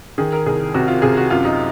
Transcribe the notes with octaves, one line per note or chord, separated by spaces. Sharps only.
D#3 G#4
A#4
C2 G#4
C3 F#4
F4
C3 G#4
F#4
F#2 F4
D#4